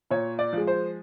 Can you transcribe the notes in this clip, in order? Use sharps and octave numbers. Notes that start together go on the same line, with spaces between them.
A#2 C#5
D5
F3 G#3
C5